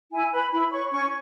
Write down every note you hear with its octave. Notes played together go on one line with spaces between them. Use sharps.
E4 G#5
B4 B5
E4 B5
C#5 C#6
C#4 C#6